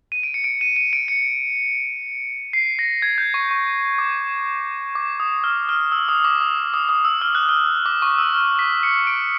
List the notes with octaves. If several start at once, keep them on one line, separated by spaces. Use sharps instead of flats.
D#7
D7
C#7
D7
D#7
D#7
D7
C#7
C7
A#6
G#6
G6
C#6
C#6
D6
D6
D#6
F6
F6
E6
D#6
D6
D#6
D#6
D#6
E6
F6
F#6
F6
D6
C#6
E6
F6
B6
C#7
D7